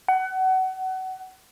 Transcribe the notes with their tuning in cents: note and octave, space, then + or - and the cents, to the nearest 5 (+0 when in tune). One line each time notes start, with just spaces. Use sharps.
F#5 +25